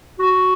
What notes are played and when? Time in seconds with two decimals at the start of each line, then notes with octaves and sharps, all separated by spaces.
0.19 F#4